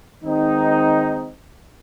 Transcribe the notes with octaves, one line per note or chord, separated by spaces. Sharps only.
D#3 G#3 C4 D#4